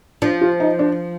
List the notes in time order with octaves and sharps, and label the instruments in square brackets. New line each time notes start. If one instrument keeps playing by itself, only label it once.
[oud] F3 [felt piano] D4
[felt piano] F4
D#4
D4